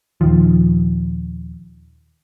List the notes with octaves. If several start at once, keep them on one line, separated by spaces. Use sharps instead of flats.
D#1 D#3 F3